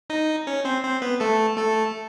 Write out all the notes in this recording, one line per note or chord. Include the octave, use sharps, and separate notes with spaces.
D#4 D#5
C#4 C#5
C4 C5
C4 C5
B3 B4
A3 A4
A3 A4